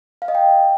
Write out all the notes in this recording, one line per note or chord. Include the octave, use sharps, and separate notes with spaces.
F5
D#5
G5